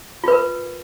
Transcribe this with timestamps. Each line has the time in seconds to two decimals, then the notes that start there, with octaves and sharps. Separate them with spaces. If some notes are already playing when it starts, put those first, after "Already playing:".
0.24 F4
0.28 B4
0.32 A#4